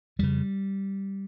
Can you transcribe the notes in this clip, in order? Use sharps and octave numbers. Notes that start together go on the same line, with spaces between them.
F2 C#3 G3